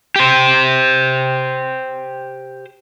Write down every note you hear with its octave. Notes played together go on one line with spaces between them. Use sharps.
G4 C5